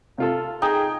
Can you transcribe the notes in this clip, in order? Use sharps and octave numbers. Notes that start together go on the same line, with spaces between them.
C3 F4 A4 F5
D#4 G#4 G5